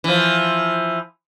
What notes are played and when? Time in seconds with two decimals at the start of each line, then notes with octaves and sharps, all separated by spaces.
0.04 E3 F3